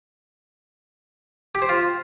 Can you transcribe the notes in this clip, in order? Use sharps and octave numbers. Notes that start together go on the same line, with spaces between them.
G4
C5
F4